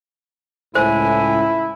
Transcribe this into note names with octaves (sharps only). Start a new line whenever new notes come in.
C#2 A2 E4 C5 G#5